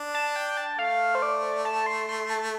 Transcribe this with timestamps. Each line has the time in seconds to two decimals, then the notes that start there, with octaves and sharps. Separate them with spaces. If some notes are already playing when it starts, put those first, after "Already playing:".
Already playing: D4
0.14 A5
0.36 G5
0.57 A5
0.79 A3 F5
1.15 C5
1.22 D5
1.65 A5
1.86 C6
2.09 C6
2.30 A5